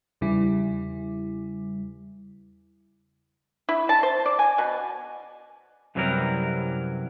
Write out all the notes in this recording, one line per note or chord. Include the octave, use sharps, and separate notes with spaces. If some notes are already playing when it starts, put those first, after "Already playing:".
E2 C#3 G3 E4
E4
A5
C5
D5
G#5
B2
F#2 C3 E3 F#3 G3 A#4